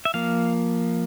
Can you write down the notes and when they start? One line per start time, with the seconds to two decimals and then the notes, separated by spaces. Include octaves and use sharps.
0.05 E5
0.14 F3 A#3 F5